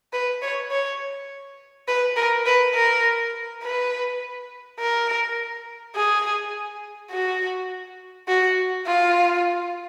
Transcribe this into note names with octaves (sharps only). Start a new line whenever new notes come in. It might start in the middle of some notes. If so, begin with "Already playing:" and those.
B4
C#5
C#5
B4
A#4
B4
A#4
B4
A#4
G#4
F#4
F#4
F4